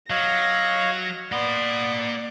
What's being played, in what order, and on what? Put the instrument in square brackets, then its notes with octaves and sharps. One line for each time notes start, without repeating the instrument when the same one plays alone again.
[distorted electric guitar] F#3 [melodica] C#5 D#5 F5 [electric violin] A#6
[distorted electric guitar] A#3 C6 [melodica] B3 [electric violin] D5